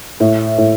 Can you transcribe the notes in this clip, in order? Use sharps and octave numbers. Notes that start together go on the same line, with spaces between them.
A2
A2